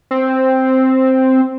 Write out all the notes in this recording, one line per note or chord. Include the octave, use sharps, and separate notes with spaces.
C4